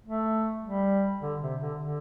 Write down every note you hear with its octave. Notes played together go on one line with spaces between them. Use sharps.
A3
G3
D3
C3
D3
D3